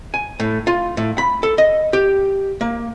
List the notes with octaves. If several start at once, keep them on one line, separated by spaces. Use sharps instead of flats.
G#5
A2
F4
A2
B5
A4
D#5
G4
A#3